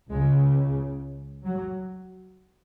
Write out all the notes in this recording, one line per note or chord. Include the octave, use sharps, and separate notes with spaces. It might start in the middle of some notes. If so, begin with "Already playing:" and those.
C#2 C#3 G#3
F#3